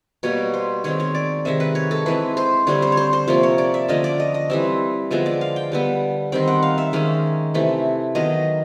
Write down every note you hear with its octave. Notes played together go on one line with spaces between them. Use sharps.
B2 G3 A#3 C#5
C5
D#3 G#3 C4 C#5
C#5
D5
C3 D#3 G#3 E5
B4
C#5
A4
E3 G#3 C4 B4
C5
D3 G3 C4 C#5
C5
C#5
C5
C5
C3 F3 A#3 C#5
C#5
D5
E5
D3 F3 A#3 C#4 D#5
D5
D#5
D#5
E3 G3 C4 E5
D3 F3 G#3 B3 E5
D5
F5
G5
D3 G3 B3
D#3 G3 C4 G5
F#5
F5
E5
D#3 G#3 C#4
C3 E3 A3
D#3 F#3 B3 D#5